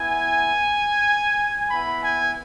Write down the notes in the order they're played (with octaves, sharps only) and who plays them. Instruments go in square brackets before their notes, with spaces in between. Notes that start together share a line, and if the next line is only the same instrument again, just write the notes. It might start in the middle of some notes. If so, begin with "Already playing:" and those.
Already playing: [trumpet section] B3 E4 G#5
B3 E4 B5
G#5